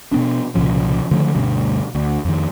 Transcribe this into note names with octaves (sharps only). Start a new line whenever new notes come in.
B2 B3 D4
C2 A#2 C#3 F3
D3 D#3 F3 A3
D2 G2 B2
D2
F2 D#3